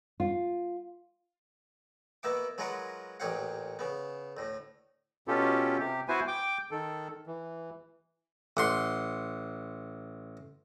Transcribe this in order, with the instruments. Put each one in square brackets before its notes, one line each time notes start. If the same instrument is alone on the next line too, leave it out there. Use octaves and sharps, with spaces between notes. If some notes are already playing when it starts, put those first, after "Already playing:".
[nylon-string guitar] F4
[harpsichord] B2 A#3 B3 E5 D6
F#3 G#3 F4 A#4 B4 F#5
A1 A#2 G4 C#5 F5 F#5
C#3 B3
D2 A2
[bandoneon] B2 C#4 F4 G4 A4
C3 G4
B3 E4 F#4 B4 C5 G#5
G5 D6
D#3 A4
E3
[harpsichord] A1 F#5 C6